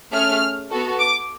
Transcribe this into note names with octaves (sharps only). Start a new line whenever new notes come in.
A3 C#4 G#4 F6
B3 F#4 A4
D6